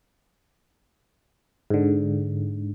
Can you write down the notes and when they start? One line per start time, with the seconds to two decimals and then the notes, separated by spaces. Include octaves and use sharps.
1.70 G#2 D3